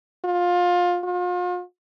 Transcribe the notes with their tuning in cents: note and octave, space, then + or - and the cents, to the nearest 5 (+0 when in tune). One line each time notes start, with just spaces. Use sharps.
F4 +20
F4 +40